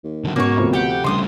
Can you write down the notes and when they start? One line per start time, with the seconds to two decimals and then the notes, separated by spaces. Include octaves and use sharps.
0.04 D#2
0.24 D3 F#3
0.36 B1 G#2 B2 A#3 B3 C#4 F#4 C#5
0.57 D2 C3 F3
0.73 G4 F#5 G5
1.04 G2 C#3 G3 C6 D6 D#6